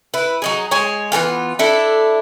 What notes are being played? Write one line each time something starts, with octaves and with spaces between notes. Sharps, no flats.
E4 B4
F#3 D#4 G#4
G#3 G#4 C#5
E3 F#3 B3 F4
D4 E4 A4